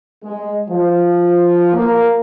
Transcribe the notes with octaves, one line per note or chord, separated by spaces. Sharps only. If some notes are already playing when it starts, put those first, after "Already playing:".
G#3
F3
A#3